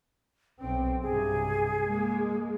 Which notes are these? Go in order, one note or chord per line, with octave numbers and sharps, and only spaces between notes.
B1 C4 G5
G2 C3 G#4
G#3 A#3